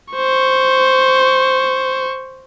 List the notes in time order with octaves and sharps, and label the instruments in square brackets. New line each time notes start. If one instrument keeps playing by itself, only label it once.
[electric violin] C5 C#6